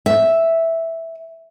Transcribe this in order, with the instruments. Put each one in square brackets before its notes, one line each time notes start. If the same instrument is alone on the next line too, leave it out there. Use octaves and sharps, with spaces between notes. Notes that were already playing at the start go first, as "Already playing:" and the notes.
[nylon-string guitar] E5